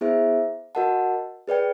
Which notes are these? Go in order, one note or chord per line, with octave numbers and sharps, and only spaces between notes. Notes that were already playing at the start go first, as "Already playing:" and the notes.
B3 E4 G#4 C5 E5
F#4 A#4 D#5 F#5 A5
G#4 B4 D5 G5